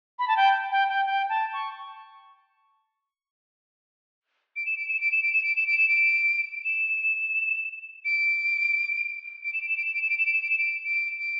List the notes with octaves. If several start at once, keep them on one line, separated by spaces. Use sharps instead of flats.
B5
A5
G5
G5
G5
G5
A5
C#6
D7
E7
D7
E7
D7
E7
D7
E7
D7
E7
D7
E7
D7
E7
D7
D7
E7
D7
E7
D7
E7
D7
E7
D7
E7
D7
E7
D7
E7
D7
D7
D7